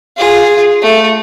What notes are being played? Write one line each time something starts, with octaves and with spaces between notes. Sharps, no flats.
F4 G#4
A3